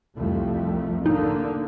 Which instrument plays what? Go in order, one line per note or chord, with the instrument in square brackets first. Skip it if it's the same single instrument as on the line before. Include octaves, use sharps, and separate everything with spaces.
[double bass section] C2 F2 A3
[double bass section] D3 A#3 [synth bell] D#4